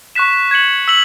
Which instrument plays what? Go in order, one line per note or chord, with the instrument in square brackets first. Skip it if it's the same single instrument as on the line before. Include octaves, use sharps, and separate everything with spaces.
[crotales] C#6 F#6 B6 E7
G#6 C#7 F#7
E6 B6 F#7